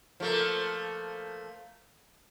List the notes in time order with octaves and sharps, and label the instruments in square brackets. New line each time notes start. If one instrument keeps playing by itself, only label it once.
[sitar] F3 A3 A#3